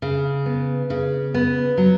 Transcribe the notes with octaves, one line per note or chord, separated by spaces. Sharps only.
C#3
B3
C#3
B3
F#3